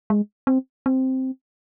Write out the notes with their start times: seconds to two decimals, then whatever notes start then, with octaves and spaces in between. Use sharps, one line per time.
0.10 G#3
0.47 C4
0.86 C4